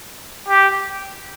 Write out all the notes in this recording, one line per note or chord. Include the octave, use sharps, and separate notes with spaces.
G4